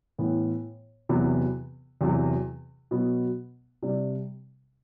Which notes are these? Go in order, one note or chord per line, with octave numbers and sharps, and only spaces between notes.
A2 E3 B3
E2 C3 F#3 B3
E2 C3 F#3
B2 F#3 B3
C3 G3 D4